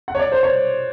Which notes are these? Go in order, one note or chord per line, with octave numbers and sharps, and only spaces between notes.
F#5
C#5
D5
C5
C#5